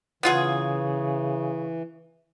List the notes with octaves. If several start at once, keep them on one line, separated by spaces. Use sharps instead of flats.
C#3 E3 B3 F4 G#4